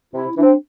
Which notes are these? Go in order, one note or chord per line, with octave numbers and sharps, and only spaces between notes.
C3 E4
E3 D4
C4